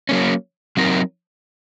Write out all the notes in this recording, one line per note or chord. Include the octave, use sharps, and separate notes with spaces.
F#3 A#3 C#4
F#3 C4 D#4 A#4